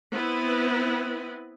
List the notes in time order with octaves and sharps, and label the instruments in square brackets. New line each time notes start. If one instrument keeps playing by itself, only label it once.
[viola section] B3 C4 E4 B4